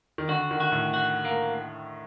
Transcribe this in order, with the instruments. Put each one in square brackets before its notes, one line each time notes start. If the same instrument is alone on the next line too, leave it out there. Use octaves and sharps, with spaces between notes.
[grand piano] D#3
[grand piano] D3 [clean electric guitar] F#4
[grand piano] D#3
[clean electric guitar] F#4
[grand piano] A2
[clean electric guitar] F#4
A#3